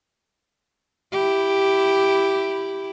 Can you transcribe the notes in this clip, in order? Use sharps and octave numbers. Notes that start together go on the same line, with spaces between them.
E4 G4